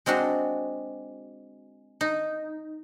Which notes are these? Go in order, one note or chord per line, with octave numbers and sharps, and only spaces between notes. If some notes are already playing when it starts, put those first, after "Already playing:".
G#3 C4 D4 F#4
D#4